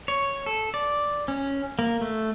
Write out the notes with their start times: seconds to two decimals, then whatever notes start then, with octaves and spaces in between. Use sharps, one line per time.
0.08 C#5
0.46 A4
0.74 D5
1.28 C#4
1.79 A#3
2.01 A3